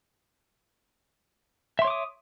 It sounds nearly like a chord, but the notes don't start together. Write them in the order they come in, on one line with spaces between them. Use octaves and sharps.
E5 C6 C#5 D6 D#6